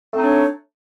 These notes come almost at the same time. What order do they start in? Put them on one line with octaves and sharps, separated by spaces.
A3 C4 D#4 C#5 D4